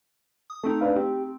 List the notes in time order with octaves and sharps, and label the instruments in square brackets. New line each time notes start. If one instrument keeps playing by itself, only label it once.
[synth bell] D#6
[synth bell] A3 C4 D#4 [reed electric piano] A4
[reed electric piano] D4 B4 F5
[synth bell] C4 [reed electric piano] G4